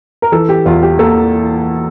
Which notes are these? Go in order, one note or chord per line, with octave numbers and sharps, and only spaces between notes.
A#4
E3 A4
G4
E2 F4
G4
A#3 A4